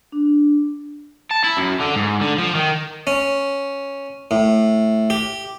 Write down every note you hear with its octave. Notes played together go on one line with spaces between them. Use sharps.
D4
A5
E4
F#2
D3
G#2
D3
F3
D#3
C#4
A2
G4